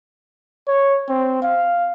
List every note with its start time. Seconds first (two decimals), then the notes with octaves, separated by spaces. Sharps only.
0.68 C#5
1.09 C4
1.42 F5